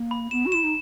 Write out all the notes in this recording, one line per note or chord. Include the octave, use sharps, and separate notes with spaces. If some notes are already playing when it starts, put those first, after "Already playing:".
Already playing: A#3
B5
B3 E7
F#4
E4 E7
D#4